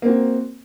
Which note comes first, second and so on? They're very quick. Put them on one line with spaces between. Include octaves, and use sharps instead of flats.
A#3 C4 F#4